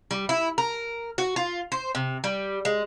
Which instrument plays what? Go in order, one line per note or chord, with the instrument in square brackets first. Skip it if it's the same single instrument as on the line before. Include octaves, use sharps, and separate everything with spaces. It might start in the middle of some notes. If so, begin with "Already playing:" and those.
[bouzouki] G3
E4
A#4
F#4
F4
C5
C3
G3
G#3